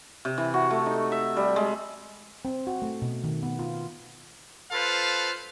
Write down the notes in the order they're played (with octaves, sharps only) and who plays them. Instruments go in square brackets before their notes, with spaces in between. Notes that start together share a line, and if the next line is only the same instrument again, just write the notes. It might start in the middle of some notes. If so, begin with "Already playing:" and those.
[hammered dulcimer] C3
E3
F#4
A3
D#4
E5
G3
G#3
[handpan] C4
F#4
A3
B2
D#3
B3
F4
[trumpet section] F4 A4 B4 C5 F5